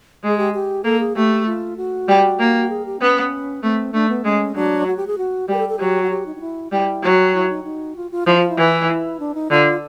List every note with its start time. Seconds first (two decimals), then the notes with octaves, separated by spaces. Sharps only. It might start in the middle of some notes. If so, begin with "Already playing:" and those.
0.23 G#3 G#4
0.38 G4
0.54 G4
0.84 A#3 A4
1.00 G#4
1.16 A3 G4
1.46 F4
1.77 F#4
2.08 G3
2.39 A#3
2.70 G#4
2.86 G4
3.00 B3 C#4
3.63 A3 C4
3.93 A3 D4
4.09 B3
4.24 G#3 C#4
4.55 F#3 D4
4.87 F#4
4.97 G4
5.07 G#4
5.18 F#4
5.48 G3 G4
5.54 A#4
5.59 A4
5.69 A4
5.79 F#3 G4
6.02 F#4
6.10 G4
6.26 D#4
6.36 D#4
6.41 E4
6.72 G3 E4
7.03 F#3
7.33 E4
7.50 D#4
7.64 D#4
7.96 F4
8.12 F4
8.26 F3 E4
8.38 F4
8.49 E4
8.57 E3
8.89 E4
9.20 D4
9.35 D#4
9.50 D3 F4